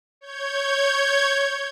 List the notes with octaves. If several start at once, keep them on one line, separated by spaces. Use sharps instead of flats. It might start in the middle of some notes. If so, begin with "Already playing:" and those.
C#5 G6 G#6